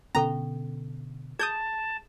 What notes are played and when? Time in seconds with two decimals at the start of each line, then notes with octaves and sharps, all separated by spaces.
0.15 B2 D3 B3 C#4 A4 A#5 C#6
1.39 G#4 A5 D#6 G6 G#6